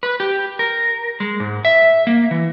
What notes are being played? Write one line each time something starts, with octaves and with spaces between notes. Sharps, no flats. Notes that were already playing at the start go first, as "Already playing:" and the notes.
B4
G4
A#4
G#3
G#2
E5
A#3
E3